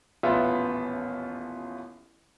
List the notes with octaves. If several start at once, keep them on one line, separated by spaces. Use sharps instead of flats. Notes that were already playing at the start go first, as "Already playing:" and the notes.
D#1 A1 B3 F4 E5 C6